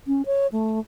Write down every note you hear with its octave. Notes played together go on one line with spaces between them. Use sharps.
C#4
C#5
A3